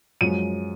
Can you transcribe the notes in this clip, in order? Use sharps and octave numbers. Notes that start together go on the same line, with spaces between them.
F#2 F3 G#3 D#7